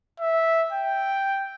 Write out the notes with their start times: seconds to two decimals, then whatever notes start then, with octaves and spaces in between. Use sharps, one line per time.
0.20 E5
0.73 G5